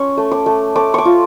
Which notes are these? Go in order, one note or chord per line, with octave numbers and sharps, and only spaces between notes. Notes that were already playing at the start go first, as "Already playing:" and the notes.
Already playing: C#4 C#6
A3
D6
A3
A3 D6
C#6 D6
F4